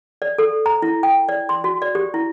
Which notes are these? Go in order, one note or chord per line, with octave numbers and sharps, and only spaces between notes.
D5
A4
A#5
E4
G5
D5
C6
F#4
D5
G4
E4